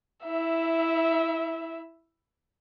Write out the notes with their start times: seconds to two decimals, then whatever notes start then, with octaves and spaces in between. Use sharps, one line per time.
0.24 E4 E5